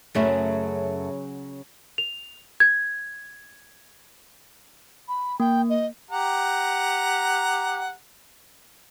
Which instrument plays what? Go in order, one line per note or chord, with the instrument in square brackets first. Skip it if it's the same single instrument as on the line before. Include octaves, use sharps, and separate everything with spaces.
[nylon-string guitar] F#2 A3 E5 [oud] C#3 F#3 C#4
[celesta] F7
G#6
[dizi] B5
[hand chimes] A#3 [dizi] G5
[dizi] D#5
[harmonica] G4 F#5 A#5